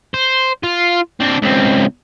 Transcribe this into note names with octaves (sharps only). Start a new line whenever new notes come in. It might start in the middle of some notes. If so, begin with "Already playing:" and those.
C5
F4
C4 D4
C#2 C4